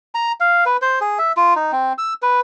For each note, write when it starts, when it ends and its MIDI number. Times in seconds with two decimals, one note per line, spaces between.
0.15 0.32 82
0.40 0.64 77
0.66 0.77 71
0.82 0.99 72
1.01 1.18 68
1.19 1.32 76
1.37 1.54 65
1.56 1.72 63
1.72 1.93 60
1.98 2.13 88
2.22 2.40 71